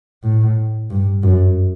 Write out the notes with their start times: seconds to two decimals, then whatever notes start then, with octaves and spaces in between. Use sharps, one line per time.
0.24 A2
0.90 G2
1.23 F#2